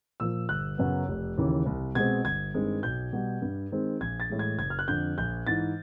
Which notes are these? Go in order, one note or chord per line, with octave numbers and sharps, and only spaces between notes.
A#2 F3 E6
G1 F#6
F#2 C#3 F#3 B3
F1
D#2 C#3 E3
C2
B2 G#3 C4 G#6
G1 G#6
G2 D#3 G#3 C4
B1 G6
B2 G3
G2
D#3 G#3 C4
A#1 G#6
A6
A2 E3 G#3
G#6
F#1 G#6
F6
F#6
F2 D3 G6
A#1 G6
G#2 E3 A6